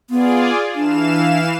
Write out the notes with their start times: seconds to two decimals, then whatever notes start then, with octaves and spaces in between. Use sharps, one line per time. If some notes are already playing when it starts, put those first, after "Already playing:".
0.10 B3 F4 G#4 D5
0.75 E3 D4 F5 E7